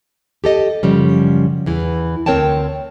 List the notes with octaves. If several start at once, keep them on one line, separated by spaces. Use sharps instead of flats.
G4 A4 D#5
F#2 C#3 F3 G3
E2 E3
D2 C4 A#4 C#5 G5 A5